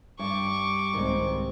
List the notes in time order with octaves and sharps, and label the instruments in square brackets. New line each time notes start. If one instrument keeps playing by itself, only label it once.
[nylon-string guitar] G2 G3 [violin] C#6 D6
[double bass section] C2 G#2 C4 [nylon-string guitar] D#3 G#3